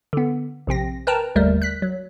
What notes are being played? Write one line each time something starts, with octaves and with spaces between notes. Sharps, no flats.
D3 B3
A#1 C3 C4 A#6
A#4 B4 G5 A5 A#5
G1 D#2 G3 A3 A#4
F#6 B6
F#3